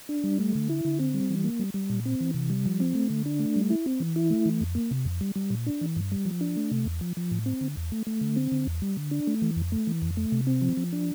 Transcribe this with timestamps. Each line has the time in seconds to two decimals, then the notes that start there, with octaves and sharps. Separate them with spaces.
0.09 D4
0.24 G3
0.39 A3
0.55 D3
0.70 E4
0.85 D3
1.00 C4
1.14 G3
1.30 E3
1.44 A#3
1.60 G3
1.74 G3
1.90 A#2
2.05 C4
2.20 E3
2.34 C3
2.50 G3
2.66 F3
2.80 C4
2.95 A3
3.10 D3
3.26 D4
3.40 A3
3.56 G3
3.70 E4
3.86 C4
4.00 E3
4.16 E4
4.30 A3
4.46 E3
4.61 F2
4.75 A#3
4.91 C3
5.05 F2
5.21 G3
5.36 G3
5.50 A#2
5.66 D4
5.81 E3
5.96 G2
6.12 G3
6.25 F3
6.41 D4
6.57 A3
6.71 C3
6.86 E2
7.01 F3
7.17 F3
7.31 A2
7.46 C4
7.61 D3
7.77 E2
7.92 A3
8.07 A3
8.21 D3
8.36 C4
8.52 D3
8.67 E2
8.82 G3
8.97 D3
9.11 D4
9.27 A3
9.42 E3
9.56 F2
9.72 A3
9.87 E3
10.02 F2
10.17 A3
10.32 C3
10.47 C4
10.62 F3
10.77 F3
10.92 D4